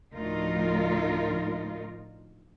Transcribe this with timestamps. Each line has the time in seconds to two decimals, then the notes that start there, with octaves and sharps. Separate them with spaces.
0.13 D2 A2 F3 D#4 F4 A#4